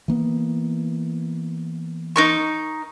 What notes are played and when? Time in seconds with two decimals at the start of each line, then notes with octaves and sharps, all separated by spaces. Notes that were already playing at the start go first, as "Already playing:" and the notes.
0.08 E3 A#3 B3
2.16 D#4 A#4 C#6